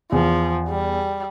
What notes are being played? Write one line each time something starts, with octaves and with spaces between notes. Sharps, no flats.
E2 F3
G3